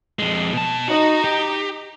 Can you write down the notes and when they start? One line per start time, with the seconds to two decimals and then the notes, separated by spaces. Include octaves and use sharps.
0.19 F2 G#3
0.53 B2 A5
0.88 D#4 F#4
1.24 G4